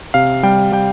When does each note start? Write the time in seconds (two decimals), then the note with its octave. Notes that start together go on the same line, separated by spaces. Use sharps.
0.14 C3 F5
0.43 G3 G5
0.72 G3 G5